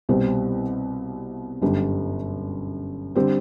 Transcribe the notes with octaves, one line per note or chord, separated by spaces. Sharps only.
C2 B2 G3 C4
G1 F#2 D3 G3
D3 G3 C4